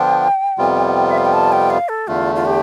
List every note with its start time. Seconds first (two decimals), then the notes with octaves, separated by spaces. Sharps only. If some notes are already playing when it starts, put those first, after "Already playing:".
Already playing: D3 F3 B3 D4 F4 G5
0.58 F2 C3 G3 B3 F4
1.10 E5
1.18 F5
1.25 G5
1.33 A5
1.52 G5
1.70 F5
1.89 A4
2.08 E2 D3 A3 F4
2.35 F4
2.46 G4